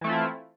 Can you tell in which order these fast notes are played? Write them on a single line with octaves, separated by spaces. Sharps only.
E3 A3 C4 F4 E4